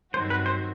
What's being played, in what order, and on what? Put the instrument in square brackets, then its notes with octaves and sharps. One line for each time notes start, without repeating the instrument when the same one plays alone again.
[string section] G2 D#3 F#3 C4 F#4 [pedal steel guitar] C5
[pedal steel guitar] B4
C5